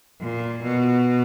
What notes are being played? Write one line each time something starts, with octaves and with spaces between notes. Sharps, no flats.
A#2
B2